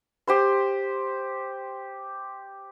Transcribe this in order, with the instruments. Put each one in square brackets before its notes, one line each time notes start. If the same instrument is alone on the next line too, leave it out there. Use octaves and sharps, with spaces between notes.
[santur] G4 C5 C6